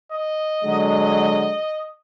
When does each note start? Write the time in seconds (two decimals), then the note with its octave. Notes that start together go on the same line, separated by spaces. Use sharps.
0.12 D#5
0.62 D3 F#3 G#3